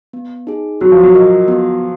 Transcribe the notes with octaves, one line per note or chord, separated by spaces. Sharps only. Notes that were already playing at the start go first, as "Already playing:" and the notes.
B3
D#4 G#4
F#3 F#4
F3
F#3
A#4 D#5
B3